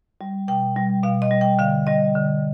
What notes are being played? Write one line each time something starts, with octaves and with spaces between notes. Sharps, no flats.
G3
B2 G5
G3
B2 F5
D#5
G3
G5
D3 F5
G3 D#5
D3